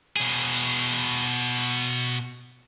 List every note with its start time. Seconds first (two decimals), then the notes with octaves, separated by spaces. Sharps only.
0.17 B2 G#4